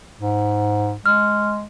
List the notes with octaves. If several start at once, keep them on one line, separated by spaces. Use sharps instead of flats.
G#2
G#3 F6